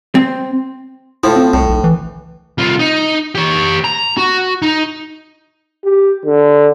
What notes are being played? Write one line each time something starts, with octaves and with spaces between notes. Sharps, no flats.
C4
A2 F3 E4
C4
C2 A2
B1
E3
C2 F4
D#4
G4 C#5
A#5
F#4
D#4
G4
D3